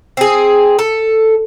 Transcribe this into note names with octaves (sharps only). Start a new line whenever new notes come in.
C4 G#4
A4